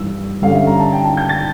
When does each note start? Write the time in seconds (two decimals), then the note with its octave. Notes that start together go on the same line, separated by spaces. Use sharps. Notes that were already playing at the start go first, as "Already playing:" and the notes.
Already playing: G2 E3 E6
0.42 G2 D3 G3 C#4 F5
0.55 E5
0.67 A#5
0.80 A5
0.93 G5
1.04 A5
1.17 G6
1.29 A6